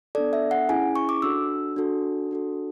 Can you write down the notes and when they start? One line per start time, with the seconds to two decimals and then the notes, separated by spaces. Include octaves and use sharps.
0.15 A4 D5
0.18 B3 D4
0.33 E5
0.51 F#5
0.69 C#4 E4 G#4 G#5
0.96 C#6
1.09 D6
1.22 D4 F#4 A4 E6
1.76 D4 F#4 A4
2.31 D4 F#4 A4